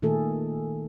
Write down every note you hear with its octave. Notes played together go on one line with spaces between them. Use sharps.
A#2 D#3 A3 G#4 A4